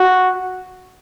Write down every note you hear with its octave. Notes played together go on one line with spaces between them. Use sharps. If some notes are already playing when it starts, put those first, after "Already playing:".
Already playing: F#4